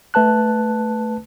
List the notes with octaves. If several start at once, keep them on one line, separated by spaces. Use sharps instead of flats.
A3 B4 A5 F#6